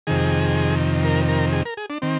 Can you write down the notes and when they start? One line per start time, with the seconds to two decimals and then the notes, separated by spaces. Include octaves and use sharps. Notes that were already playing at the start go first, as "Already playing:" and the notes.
0.07 F2 C3 D#3 G#4
1.04 A#4
1.28 A#4
1.53 G#4
1.66 A#4
1.77 G#4
1.90 D4
2.02 D#3 C4